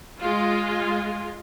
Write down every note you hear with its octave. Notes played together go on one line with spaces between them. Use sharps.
G#3 F4